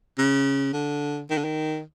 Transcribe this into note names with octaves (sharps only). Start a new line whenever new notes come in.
C#3
D3
D#3
D3
D#3